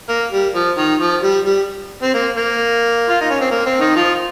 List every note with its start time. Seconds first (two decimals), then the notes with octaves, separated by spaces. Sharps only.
0.09 A#3
0.32 G3
0.55 F3
0.78 D#3
1.00 F3
1.23 G3
1.46 G3
2.03 C4
2.14 A#3
2.37 A#3
3.09 F4
3.20 D#4
3.30 C#4
3.41 C4
3.51 A#3
3.66 C4
3.80 D#3 D#4
3.96 F3 F4